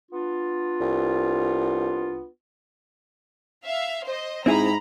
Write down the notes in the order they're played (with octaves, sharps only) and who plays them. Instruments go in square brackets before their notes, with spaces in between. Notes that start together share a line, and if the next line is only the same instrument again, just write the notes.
[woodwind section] B3 D4 F4
[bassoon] C2
[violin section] E5 F5
C5 D#5
[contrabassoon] G#2 [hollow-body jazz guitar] C4 E4 G#4 [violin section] A#5 B5